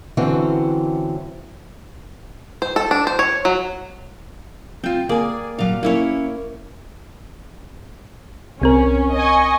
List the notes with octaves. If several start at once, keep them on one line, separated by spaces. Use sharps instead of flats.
D3 E3 F#3 C4 C#4
C5
A4
D4
C5
C#5
F#3
C4 F4 G5
A#3 G#4 D5 G#5
A#2 F#3 F5 D6
A#3 C#4 E4 A#4 C#5
C2 C4 C#4 A#4
D#5 G#5 C#6